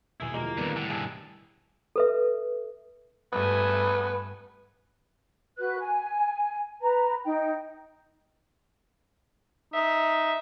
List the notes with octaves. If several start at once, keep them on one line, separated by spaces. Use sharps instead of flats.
D#1 E2 B2 E4 G#4
D2 F3 G#3 A#3 E4 G4 C5
F2 D3 D#3 G3 A3 B3 D4
A2 D3 F#5 G5
B1 G2 G#4 A4 G5
A4 B4 E5
G2 A3 B3 G#5
F#4 B4 F#6
G#5
B4 A#5
D#4 G5
D#4 E5